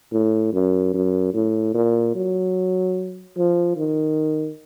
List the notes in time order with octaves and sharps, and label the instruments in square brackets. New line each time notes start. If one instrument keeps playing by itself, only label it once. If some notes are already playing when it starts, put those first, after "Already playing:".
[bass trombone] A2
F#2
F#2
A2
A#2
F#3
F3
D#3